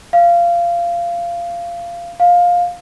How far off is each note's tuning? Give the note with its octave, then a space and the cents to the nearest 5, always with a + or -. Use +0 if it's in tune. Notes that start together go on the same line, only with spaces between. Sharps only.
F5 -20
F5 +15